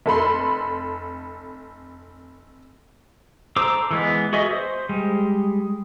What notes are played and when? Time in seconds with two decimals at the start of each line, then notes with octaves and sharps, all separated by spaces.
0.06 F1 A4 B5 C6
3.56 A4 C5 A#5 D6 E6
3.91 E3 G#3 B3
4.33 F#4 G#4 D#5 E5
4.51 C5
4.89 G3 G#3